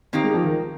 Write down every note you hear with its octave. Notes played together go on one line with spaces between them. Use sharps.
D#3 A#3 C4 D#4 G4
G#3
F3
D#3